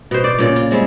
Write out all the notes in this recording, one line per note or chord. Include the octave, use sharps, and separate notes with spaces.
B2 C5
D5
A#2 C#3 D5
F4
G3 G#3 C4